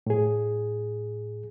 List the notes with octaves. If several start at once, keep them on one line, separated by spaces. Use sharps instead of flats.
A2 G#4